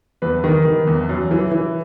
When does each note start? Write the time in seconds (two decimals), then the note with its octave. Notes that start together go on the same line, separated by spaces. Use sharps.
0.22 E2 B4
0.44 D#3
0.65 D#3
0.87 E2
1.09 F#2
1.31 E3
1.51 E3